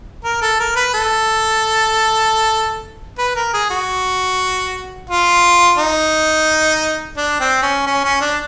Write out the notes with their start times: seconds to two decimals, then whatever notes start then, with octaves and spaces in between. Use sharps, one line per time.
0.24 A#4
0.42 A4
0.60 A#4
0.76 B4
0.94 A4
3.18 B4
3.36 A#4
3.54 G#4
3.71 F#4
5.10 F4
5.78 D#4
7.17 D4
7.40 C4
7.63 C#4
7.87 C#4
8.04 C#4
8.21 D4